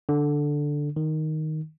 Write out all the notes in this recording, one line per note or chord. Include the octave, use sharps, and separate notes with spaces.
D3
D#3